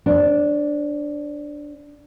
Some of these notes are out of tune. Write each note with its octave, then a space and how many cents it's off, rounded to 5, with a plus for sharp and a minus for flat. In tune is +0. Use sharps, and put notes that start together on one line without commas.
D4 +0 C5 +40